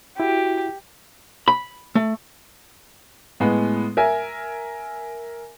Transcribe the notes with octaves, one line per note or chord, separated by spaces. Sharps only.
E4 F#4 G4
B5
A3
A2 G#3 B3
A#4 E5 G#5